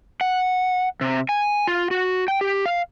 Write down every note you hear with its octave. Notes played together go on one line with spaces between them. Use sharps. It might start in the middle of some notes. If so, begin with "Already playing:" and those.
F#5
C3
G#5
F4
F#4
G5
G4
F5